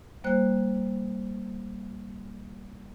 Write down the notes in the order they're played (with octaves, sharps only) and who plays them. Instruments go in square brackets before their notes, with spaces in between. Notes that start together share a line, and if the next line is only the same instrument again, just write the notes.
[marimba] G3 A#3 C5 F#6